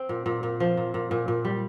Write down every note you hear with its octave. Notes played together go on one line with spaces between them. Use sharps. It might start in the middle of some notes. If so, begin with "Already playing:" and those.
Already playing: C4
A#2
A#2
A#2
F3
A#2
A#2
A#2
A#2
G3